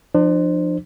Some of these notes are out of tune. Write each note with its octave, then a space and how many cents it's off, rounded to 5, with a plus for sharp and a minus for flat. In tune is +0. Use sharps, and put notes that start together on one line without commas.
F3 +0 D4 +40 C5 +0